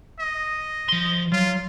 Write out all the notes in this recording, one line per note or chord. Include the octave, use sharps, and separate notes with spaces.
D#5
F3 C6
F#3 F4